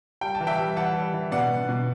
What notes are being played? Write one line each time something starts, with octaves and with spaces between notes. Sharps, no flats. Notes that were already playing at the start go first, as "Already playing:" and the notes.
G3 G5
A5
E3
E5 G5
G3
E3 F#5 A5
G3
E3
B2 D5 F#5
B2
B2